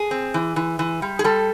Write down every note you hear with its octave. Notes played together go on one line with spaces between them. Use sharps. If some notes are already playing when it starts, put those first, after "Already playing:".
Already playing: G#4
C4
E3
E3
E3
G3
G#4
G3 A4